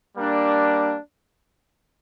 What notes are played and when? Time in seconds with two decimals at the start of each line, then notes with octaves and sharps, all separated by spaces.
0.17 G3 A#3 D4